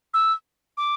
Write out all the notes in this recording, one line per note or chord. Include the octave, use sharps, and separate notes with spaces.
E6
D6